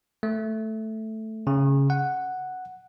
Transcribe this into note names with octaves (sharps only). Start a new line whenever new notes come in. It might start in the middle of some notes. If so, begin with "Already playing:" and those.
A3
C#3
F#5